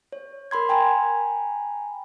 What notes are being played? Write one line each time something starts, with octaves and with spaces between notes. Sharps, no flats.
C#5
A#4 B5 C6 G#6
G5 G#5 A#5 B5